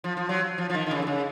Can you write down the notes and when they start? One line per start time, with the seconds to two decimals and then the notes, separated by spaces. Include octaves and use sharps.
0.04 F3
0.17 F3
0.29 F#3
0.58 F3
0.70 F3
0.74 D#3
0.86 D#3
0.91 C#3
1.02 C3
1.07 C#3